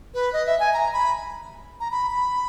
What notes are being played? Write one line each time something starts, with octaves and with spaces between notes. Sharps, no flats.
B4
D#5
E5
G#5
A#5
B5
A#5
B5
B5